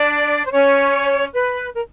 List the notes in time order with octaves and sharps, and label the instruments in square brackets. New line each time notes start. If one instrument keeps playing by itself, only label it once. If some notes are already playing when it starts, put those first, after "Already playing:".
Already playing: [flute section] D4 D5
C5
C#4 C#5
B4
A#4